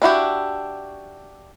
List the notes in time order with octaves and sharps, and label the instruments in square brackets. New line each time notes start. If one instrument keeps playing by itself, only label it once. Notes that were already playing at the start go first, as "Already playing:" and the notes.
[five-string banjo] D4 E4 F#4 G4